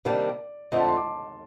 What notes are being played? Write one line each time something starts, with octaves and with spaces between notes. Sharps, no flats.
C3 D#3 G3 A#3 D4 D5
F2 D3 A3 C4 D#5
A5
C6
D6